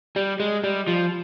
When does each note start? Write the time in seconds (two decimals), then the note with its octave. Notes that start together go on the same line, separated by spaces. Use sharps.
0.16 G3
0.40 G#3
0.64 G3
0.87 F3